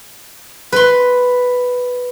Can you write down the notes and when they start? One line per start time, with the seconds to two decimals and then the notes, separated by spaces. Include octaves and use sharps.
0.72 B4 C6